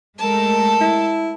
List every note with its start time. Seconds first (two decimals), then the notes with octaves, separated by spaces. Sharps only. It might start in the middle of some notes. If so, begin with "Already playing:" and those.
0.18 G#3 A3 A4 A#4 A5
0.81 E4